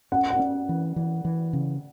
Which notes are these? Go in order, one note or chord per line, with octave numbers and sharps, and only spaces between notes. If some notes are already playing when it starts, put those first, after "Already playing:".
C#4 F#5
F#5
C#4
E3
E3
E3
C#3